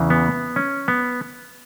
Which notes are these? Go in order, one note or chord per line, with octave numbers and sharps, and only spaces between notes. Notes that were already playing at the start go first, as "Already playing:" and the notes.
Already playing: E2 C#3 E3
B3
C#4
B3